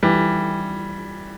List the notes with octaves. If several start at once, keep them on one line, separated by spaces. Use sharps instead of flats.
E3 G3